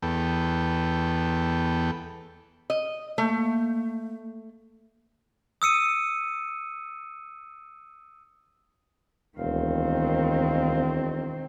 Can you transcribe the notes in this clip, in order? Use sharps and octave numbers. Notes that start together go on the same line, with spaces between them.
E2 B3 A4 G5
D#5
A3 A#3
D#6 E6 C#7 D#7
E1 D2 D#3 C4 A#4 F5